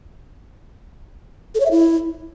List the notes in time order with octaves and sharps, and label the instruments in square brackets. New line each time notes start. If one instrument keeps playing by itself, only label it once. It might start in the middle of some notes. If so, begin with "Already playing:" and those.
[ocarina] A4
C#5
E5
E4